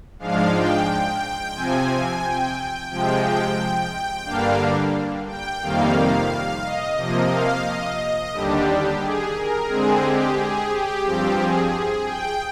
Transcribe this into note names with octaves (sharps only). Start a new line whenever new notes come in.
G#2 F3 G#3 D4 F5
G5
C3 F3 C4 G#5
G5
C3 F3 G#3 G5
G5
G2 D3 G3 A#3 D4 F5
G5
F2 C3 D#3 G3 A#3 F5
D#5
C3 F3 A#3
F5
D#5
D#2 D3 G3 D4 G4
G#4
A#4
D3 G#3 C4 G#4
G4
G#4
G4
G2 F3 C4
G#4
G5